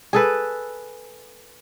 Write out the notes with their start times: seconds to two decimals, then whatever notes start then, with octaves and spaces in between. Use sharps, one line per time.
0.13 G#4 A4 B4